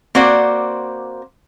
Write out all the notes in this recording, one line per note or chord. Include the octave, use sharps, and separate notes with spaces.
A#3 C4 F#4 C5 D5